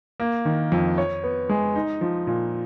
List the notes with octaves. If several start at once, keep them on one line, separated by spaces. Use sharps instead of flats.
A#3
D#3
F2
C#5
B3
G#3
D#4
F3
A#2